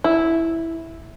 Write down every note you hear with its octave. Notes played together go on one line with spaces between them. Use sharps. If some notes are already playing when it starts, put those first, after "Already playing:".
E4